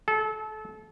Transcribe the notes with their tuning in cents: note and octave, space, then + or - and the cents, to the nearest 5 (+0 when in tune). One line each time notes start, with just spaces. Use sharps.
A4 -30